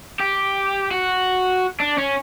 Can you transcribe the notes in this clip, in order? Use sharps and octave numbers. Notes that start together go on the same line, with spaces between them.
G4
F#4
D4
C#4